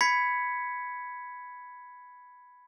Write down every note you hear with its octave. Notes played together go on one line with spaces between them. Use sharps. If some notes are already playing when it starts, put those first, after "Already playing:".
B5 G#6 B6 C#7